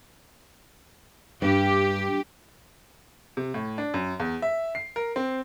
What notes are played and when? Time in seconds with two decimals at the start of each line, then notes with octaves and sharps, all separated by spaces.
1.42 G2 G4
3.37 C3
3.54 A2
3.78 D4
3.94 F#2
4.20 E2
4.42 E5
4.75 C7
4.96 A#4
5.16 C4